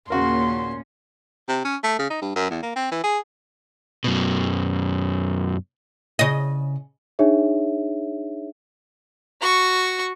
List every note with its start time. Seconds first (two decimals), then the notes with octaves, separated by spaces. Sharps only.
0.10 D#2 A#2 C#3 C#4 F#4 A#4 C6
1.49 C3
1.65 C#4
1.83 A3
1.99 C#3
2.10 D#4
2.22 G2
2.35 F#2
2.50 E2
2.63 A#3
2.76 C4
2.92 E3
3.04 G#4
4.04 F#2 B2
6.19 C#3 D#5
7.19 D4 D#4 G#4 C#5 E5
9.41 F#4 C#6